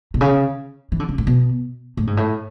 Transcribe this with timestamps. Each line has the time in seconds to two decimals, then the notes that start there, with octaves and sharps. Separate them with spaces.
0.14 B2
0.21 C#3
0.92 E3
1.00 D3
1.09 C#3
1.18 A2
1.27 B2
1.97 A2
2.07 G#2
2.17 A2